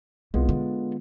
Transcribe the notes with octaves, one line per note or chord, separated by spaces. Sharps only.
C2 G#3 B3 F4
D3